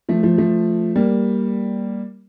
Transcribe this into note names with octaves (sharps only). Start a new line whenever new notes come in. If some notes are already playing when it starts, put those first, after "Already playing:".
F3 A3
F3 A3
F3 A3
G3 A#3